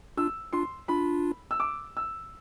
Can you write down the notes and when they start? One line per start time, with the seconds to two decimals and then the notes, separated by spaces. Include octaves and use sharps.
0.17 D4 F4 E6
0.53 D4 F4 C6
0.88 D4 F4 B5
1.51 E6
1.60 D6
1.97 E6